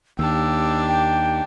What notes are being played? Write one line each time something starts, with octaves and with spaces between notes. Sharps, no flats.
D#2 D4 G4 E6
G5